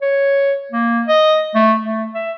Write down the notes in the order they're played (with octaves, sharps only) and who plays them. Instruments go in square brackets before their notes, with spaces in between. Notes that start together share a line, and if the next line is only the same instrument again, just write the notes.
[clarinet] C#5
A#3
D#5
A3
A3
E5